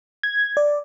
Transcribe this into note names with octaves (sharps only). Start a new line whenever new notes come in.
G#6
D5